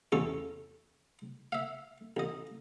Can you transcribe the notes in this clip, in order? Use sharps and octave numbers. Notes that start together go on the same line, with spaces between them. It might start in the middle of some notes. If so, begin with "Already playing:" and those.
A1 E2 C#4 A4 C#6
E5 F5
A1 D#5